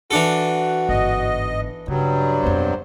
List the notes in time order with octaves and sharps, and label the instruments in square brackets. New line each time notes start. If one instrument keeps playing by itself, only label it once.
[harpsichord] E3 D4 A4 [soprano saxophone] F#4
[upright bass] G1 G#2 [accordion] D#5
[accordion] G2 F#3 G3 [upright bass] C#3
[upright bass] F2 B2 [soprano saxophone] C5